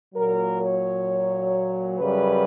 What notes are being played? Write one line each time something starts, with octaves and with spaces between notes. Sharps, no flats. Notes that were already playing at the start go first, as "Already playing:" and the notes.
A#2 F#3 A#4
C#5
F#2 C#3 G3 B4